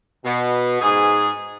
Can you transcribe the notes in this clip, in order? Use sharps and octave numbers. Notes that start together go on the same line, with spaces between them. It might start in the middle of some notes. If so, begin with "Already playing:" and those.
B2
G#2 G#4